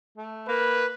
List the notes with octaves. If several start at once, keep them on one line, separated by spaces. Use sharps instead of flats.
A3
A#3 B4